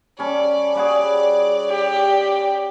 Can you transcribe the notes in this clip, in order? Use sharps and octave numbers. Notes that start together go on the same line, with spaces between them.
G3 C#4 A4 D5
G3 F#4 G#4
G4